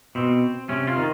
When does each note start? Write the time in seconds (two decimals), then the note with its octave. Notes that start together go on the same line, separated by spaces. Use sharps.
0.15 B2 C4
0.69 C3 C#4
0.87 F4
0.96 D#3